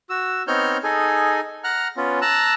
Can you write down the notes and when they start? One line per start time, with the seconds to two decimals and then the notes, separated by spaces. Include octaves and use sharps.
0.10 F#4 E6
0.47 B3 C4 D#4 C#5 F6 G6
0.83 D#4 G#4 A4 G#5
1.64 F#5 A#5 F6 F#6
1.97 B3 C#4 F4
2.22 A5 A#5 E6 F#6